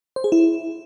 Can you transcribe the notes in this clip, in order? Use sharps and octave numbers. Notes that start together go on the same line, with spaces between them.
C5
G#4
E4